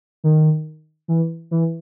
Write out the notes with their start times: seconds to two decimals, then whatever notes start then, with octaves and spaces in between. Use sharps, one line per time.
0.24 D#3
1.08 E3
1.51 E3